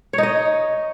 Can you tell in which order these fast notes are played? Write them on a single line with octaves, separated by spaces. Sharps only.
C#5 D#4 D#5